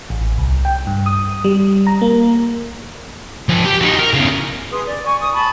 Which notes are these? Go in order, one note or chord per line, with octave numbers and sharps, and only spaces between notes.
A1
C2
G5
G2
D#6
G3
A#5
A#3
F3 G#5
G4
D#4 F#4
A#4
E2 C#3
G#4 B4 C6 D#6
D5
G#5 C#6
D#6
A5 B5 C#6